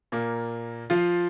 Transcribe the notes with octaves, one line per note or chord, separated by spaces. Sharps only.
A#2 A#3
F3 F4